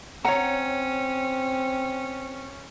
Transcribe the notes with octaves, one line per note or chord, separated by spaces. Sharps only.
C4 C#4 C#5 F#5 A#5